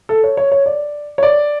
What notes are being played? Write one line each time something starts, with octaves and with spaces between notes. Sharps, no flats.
A4
C#5
C#5
C#5
D5
C#5
D5